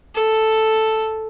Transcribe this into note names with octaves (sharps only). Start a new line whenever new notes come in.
A4